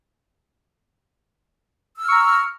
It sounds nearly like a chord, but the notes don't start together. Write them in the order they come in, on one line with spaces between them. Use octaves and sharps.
E6 F6 C#6 A#5